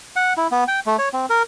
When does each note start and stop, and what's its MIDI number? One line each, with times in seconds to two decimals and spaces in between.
0.16 0.33 78
0.37 0.47 64
0.51 0.64 59
0.68 0.80 79
0.86 0.97 57
0.99 1.09 73
1.13 1.26 60
1.30 1.43 70